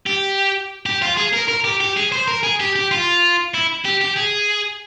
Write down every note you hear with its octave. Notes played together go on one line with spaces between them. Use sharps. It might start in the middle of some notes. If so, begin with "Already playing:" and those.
G4
G4
F4
G#4
A#4
A#4
G4
G4
G#4
C5
A#4
G#4
G4
G4
F4
E4
G4
G4
G#4